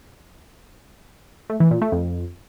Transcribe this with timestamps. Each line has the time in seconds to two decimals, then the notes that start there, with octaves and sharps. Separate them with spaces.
1.50 A3
1.60 E3
1.71 A#2
1.82 A3
1.92 F2